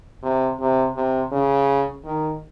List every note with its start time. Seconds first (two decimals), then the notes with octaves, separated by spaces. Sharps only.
0.23 C3
0.60 C3
0.95 C3
1.32 C#3
2.04 D#3